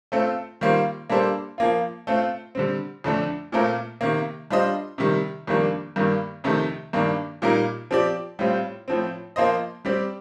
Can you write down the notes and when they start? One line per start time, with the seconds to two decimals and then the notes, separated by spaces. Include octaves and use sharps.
0.12 A3 C4 F4 A4
0.61 D#3 G3 A#3 F4 C5
1.10 G3 A#3 D4 A4 C5
1.58 F3 A#3 F4
2.07 A3 C4 F4
2.55 D3 G3 C4
3.04 F2 D3 A3 D4
3.52 A#2 A3 C4 F4 A#4
4.01 C3 D#3 A#3
4.50 G3 D4 F4 C5 D#5
4.98 C3 D#3 G3
5.47 F2 D#3 G3 A#3 D4
5.96 G2 D#3 G3 A#3
6.44 F2 C3 D#3 A3 D#4
6.93 G2 D#3 A#3 D4
7.42 A#2 G3 A#3 D#4 A#4
7.91 F3 C4 G4 D5
8.39 A2 G3 C4 F4
8.88 A2 F3 C4
9.36 F3 A#3 F4 C5 D#5
9.85 G3 C4 G4 D5